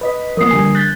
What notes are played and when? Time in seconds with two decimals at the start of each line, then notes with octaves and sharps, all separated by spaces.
0.01 B4 D#5 B6
0.37 F3 A#3 A#4 D#6 C7
0.51 D3 G3 G#5
0.75 F#6 G6 A6 B6